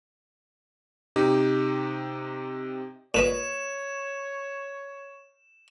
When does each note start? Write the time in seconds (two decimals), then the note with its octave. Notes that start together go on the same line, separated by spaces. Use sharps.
1.16 C3 D#4 G4
3.14 A#2 B4 C#5 D#5 E7